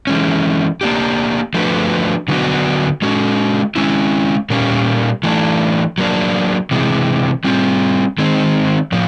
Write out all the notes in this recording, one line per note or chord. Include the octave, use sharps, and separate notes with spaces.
E3 G#3 C#4
A#3 D4 G4
F3 A3 D4 F#4 B4
D3 F#3 B3 D4 F#4
G#3 C#4 F#4
G#3 C#4 E4
A#2 G3 A#3 C#4
E3 A3 D4
F#3 A#3 D4
C3 E3 G#3
G3 C4 F4
D#3 G#3 C4
A2 F3